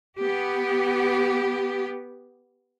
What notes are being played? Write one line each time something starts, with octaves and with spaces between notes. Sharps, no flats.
B3 G4